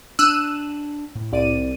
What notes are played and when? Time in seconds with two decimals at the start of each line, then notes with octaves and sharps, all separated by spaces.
0.19 D4 E6 F#6 D#7
1.15 A2
1.32 C2 D5 D#7